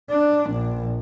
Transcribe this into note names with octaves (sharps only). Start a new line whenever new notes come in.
D4
A#1